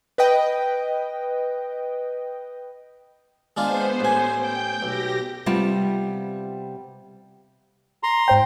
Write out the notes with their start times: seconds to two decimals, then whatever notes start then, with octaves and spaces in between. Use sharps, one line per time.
0.18 B4 D#5 G5
3.57 G#3 B3 D4 F4 C5
4.00 A1 G#5
4.36 G5 G6
4.82 B1 G4 A#6
5.46 C3 G3 B3 F4 A5
8.03 A#5 C6
8.28 G#2 C5 G5